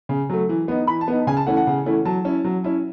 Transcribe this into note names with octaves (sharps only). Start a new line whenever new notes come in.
C#3
F#3 A3
E3
B3 D#4
E3 B5
A5
B3 D#4
C#3 G#5
A5
E3 A3 C#4 E4 F#5
F#5
C#3
E3 A3 C#4 E4
F#3 A5
C#4 E4
F#3
C#4 E4